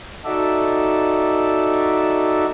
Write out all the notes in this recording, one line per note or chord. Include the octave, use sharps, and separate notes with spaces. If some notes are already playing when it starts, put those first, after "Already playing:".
D#4 F#4 A4 D5 E5